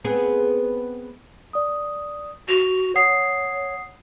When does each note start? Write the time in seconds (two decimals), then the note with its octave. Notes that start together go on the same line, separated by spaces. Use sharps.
0.04 B3 C4 G#4
1.53 D5 D#6
2.49 F#4 F7
2.95 C#5 F#5 D#6 C7